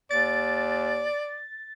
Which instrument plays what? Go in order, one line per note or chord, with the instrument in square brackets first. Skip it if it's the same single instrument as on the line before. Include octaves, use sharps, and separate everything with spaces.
[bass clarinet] D#2 [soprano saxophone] D5 [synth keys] A6